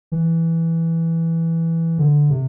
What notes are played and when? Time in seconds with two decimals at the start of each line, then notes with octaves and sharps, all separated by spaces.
0.12 E3
1.98 D3
2.30 C3